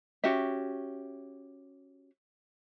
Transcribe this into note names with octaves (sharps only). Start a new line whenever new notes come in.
C#4 F#4 G4 E5